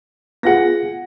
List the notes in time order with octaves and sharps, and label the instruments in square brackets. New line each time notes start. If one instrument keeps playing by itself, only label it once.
[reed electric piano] B3 F4 G#4 [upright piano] F#5 A#6